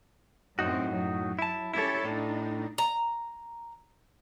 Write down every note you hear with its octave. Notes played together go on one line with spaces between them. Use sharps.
F#2 A2 C4 D#4 F#4
F#3
E4 A5
C#4 E4 G4 A4 C#5
A2 D4 D#4
A#5